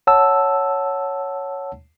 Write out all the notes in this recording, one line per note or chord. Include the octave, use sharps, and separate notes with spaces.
C#5 F#5 A5 E6